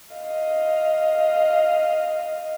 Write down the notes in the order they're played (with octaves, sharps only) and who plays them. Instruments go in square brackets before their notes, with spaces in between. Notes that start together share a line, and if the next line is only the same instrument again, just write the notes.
[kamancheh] D#5 F5